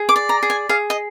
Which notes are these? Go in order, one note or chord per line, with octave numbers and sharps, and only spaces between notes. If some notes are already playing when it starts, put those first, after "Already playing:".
Already playing: G#4
D6
D5
A#5
G#4
G#5
G#4 F5
D#5